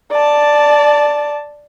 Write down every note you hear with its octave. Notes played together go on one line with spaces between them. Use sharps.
D5 A5